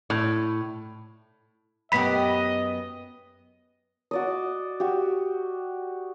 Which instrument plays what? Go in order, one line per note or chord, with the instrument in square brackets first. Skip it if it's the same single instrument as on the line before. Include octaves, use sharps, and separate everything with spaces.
[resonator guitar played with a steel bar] A2
[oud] F#2 B3 G4 [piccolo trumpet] D#5 [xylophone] B5 B6
[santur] F#4 D5 D#5
F#4 G4